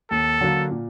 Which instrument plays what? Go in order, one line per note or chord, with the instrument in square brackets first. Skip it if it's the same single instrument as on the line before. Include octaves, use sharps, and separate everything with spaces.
[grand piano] D#2 [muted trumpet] A4
[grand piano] D3 F#3 A#3 D4
A#2